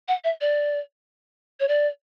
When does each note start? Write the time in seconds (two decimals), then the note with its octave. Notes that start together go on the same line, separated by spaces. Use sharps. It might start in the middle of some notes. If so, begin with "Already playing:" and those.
0.08 F#5
0.24 E5
0.41 D5
1.60 C#5
1.68 D5